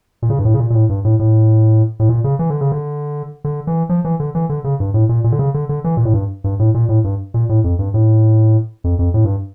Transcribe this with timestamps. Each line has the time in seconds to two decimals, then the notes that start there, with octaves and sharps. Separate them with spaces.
0.22 A#2
0.30 C#3
0.39 G2
0.45 A2
0.54 C#3
0.60 A#2
0.70 A#2
0.75 A2
0.89 G2
1.05 A2
1.19 A2
2.00 A2
2.09 A#2
2.24 C#3
2.39 E3
2.50 D3
2.61 C#3
2.72 D3
3.44 D3
3.67 E3
3.89 F3
4.05 E3
4.20 D3
4.35 E3
4.49 D3
4.64 C#3
4.80 G2
4.94 A2
5.09 A#2
5.24 A#2
5.32 D3
5.39 C#3
5.54 D3
5.69 D3
5.84 E3
5.97 A#2
6.05 A2
6.14 G2
6.44 G2
6.59 A2
6.74 A#2
6.89 A2
7.04 G2
7.34 A#2
7.49 A2
7.64 F2
7.79 G2
7.94 A2
8.84 F2
8.99 F2
9.14 A2
9.25 G2